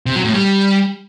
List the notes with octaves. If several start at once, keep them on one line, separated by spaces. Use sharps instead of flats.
C3
F#3
A2
G3